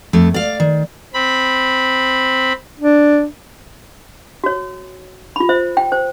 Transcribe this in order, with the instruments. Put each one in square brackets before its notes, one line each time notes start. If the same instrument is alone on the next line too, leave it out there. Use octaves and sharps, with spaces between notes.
[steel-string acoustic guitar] F2 A3
D5 F5
D#3
[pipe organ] C4 B5
[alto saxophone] D4
[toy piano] F#4 C#5
F4 B5
C5 E5
G5
C5